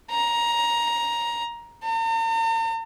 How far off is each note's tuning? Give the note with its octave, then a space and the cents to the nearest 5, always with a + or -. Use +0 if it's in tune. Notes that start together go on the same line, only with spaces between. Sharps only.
A#5 +15
A#5 -45